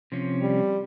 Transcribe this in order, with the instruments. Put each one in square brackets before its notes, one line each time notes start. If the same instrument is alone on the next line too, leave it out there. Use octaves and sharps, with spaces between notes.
[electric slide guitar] C3 F3 C#4
[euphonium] G3